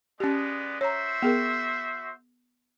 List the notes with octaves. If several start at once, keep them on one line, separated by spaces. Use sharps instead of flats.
G#3 B3 C#4 G4 D5
F#4 C5 C#5 E5 A#5
B3 G#4 A#4